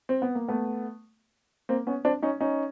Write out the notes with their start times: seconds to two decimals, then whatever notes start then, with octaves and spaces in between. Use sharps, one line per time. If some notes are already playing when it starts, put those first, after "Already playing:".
0.09 C4
0.22 B3
0.35 A#3
0.48 A3 B3
1.69 A#3 C4
1.87 B3 C#4
2.05 C4 D4
2.22 C#4 D#4
2.41 C#4 D#4